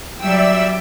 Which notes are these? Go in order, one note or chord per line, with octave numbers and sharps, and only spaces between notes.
F#3 G3 D5 E5 G5 E6